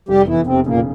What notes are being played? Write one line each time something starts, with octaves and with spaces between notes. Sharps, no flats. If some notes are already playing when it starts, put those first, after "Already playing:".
F1 G3 G4
E2 E3 E4
F1 C3 C4
A#2 C#3 A#3